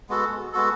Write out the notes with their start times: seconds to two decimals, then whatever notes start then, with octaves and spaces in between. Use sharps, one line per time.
0.09 G#3 B3 F#4 A4
0.53 G#3 B3 F#4 A4